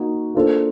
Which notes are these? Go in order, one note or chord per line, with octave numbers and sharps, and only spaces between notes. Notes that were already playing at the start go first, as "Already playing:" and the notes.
Already playing: A#3 D#4 F#4
A#3 D4 F4 A4 C5